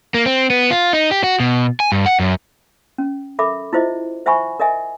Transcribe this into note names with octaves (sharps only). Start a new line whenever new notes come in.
A#3
C4
B3
F4
D#4
G4
F#4
B2
G#5
G2
F#5
F#2
C#4
A4 A#4 E5 B5 D6
E4 F4 C5 D#5 E5
C5 E5 F#5 G#5 B5 C#6
A#4 D#5 E5 G#5